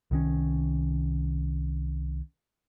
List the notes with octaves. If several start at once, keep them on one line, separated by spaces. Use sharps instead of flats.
C2 D#3 C#4